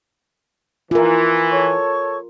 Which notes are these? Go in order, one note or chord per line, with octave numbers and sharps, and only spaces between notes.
E3 F4 A#4
A4 C#5 C#6